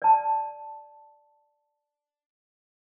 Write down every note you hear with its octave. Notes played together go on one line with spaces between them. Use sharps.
D5 A5